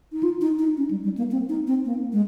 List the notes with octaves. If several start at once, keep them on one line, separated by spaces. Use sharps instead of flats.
D#4
F4
D#4
D#4
C#4
G3
G3
A#3
C4
D#4
C4
A#3
G#3